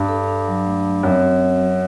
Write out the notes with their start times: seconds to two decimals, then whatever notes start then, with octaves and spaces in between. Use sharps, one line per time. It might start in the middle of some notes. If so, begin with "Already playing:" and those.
Already playing: G2 D4
0.08 A4
0.28 D4
0.47 F#3
0.66 A3
0.84 F#3
1.03 F#2 C4
1.22 F#4
1.42 F#5
1.60 F#3